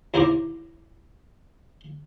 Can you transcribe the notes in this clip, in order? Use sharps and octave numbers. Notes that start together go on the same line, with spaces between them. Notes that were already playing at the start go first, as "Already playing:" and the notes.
D#2 E4 C5 A#5 D6